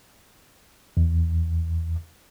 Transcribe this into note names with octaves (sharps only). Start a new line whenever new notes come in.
E2